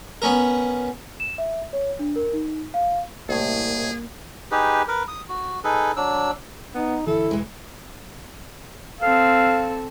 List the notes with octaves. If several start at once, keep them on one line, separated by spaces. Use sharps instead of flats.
B3 C#4 A#4
E7
E5
C#5
D4
A#4
D#4
F5
C2 A2 A#3 G#4
D#4 G4 G#4 B4
A#4 B4
D#6
F#4
D#4 G#4 A4 B4
F#3 D4 E6
B3 D#4
G1 D3 E3 E4 A4
E1 B1 E3 G#3
C4 A4 F5